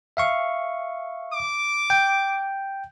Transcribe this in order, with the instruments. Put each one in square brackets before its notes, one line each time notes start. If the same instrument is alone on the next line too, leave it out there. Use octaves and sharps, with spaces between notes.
[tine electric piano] E5 F5 C#6
[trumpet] D6
[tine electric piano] G5